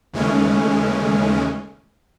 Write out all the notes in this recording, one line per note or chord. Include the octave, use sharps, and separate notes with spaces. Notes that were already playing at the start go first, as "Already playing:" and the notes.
D#2 C#3 E3 G#3 A3 C#4